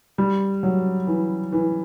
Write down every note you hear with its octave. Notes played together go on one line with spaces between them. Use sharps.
G3
F#3
E3
E3